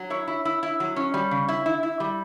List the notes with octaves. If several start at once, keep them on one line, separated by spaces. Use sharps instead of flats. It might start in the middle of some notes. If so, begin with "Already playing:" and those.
Already playing: F#3
E4 C#5
E4
E4
E4
F#3
C#4
G3
C#3
E4
E4
E4
G3